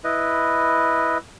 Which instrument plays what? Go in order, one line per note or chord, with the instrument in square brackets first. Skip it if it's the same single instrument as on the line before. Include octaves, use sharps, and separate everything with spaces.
[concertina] E4 B4 D#5